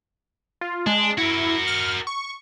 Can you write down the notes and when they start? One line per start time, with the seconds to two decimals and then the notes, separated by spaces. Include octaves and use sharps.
0.61 F4
0.86 G#3 D4
1.18 E4 F#4 A#4
1.67 F6
2.07 C#6